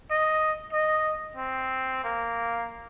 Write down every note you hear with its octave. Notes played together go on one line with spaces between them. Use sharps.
D#5
D#5
C4
A#3